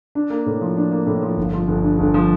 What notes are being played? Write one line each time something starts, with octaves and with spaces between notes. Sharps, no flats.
D4
A#3
A2
F3
D4
A#3
A2
F3
G1
F3
G1
G2
G1
F3